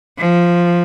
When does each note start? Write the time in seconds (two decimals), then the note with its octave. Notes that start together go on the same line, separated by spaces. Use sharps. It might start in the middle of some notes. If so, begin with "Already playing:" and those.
0.19 F3